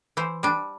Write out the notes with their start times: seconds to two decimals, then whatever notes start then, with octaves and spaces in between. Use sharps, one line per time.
0.17 E3 C5
0.43 G3 D4